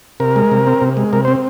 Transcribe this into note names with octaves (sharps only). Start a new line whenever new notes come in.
C3 A#4
G#3
C3
C4
C3
G#3
C3 A#4
C5
C4